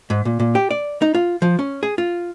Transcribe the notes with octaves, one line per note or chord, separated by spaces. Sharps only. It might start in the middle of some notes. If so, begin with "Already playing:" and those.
G#2
A#2
A#2
G4
D5
D#4
F4
F3
C#4
G#4
F4